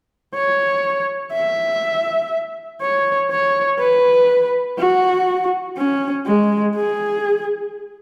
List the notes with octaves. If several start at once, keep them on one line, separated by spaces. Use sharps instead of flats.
C#5
E5
C#5
C#5
B4
F#4
C#4
G#3
G#4